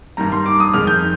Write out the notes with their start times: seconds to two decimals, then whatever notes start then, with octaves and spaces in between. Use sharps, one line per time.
0.17 G2 D#3 G3 A#5
0.32 C6
0.46 D6
0.60 D#6
0.73 F2 D#3 G#3 F6
0.87 G6